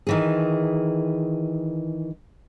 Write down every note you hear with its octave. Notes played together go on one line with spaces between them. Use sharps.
D#3 E3 G#4